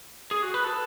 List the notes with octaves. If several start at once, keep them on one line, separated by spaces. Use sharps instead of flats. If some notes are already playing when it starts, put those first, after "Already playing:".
G#4
F#4
B4
A4